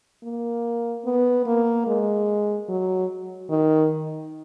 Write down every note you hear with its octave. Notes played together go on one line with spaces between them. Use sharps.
A#3
B3
A#3
G#3
F#3
D#3